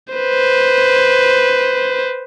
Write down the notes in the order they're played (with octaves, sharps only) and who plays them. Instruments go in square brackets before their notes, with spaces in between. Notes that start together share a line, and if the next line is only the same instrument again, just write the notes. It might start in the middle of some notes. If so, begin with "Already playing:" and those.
[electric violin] B4 C5